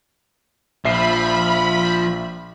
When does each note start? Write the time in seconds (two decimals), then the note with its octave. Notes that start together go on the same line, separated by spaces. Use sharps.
0.85 A#1 F3 E5 B5 C7